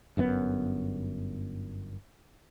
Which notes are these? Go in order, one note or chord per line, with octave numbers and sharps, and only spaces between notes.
G1 F#2 C#3 B3